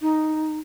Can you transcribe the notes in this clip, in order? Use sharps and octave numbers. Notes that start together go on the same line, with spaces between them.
D#4